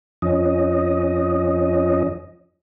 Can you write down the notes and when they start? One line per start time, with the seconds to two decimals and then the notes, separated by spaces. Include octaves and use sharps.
0.22 F2 F3 C#4 D#5